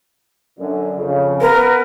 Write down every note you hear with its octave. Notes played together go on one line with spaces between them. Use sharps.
F#2 D3
F2 C#3
B3 A#4 B4